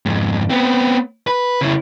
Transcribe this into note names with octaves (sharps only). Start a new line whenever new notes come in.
F2 G#2
B3 C4
B4
C#3 E4